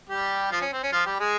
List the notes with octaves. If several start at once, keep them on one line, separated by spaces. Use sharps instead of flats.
G3 G4
F3 F4
C#4
C4
C#4
F3 F4
G3 G4
G#3 G#4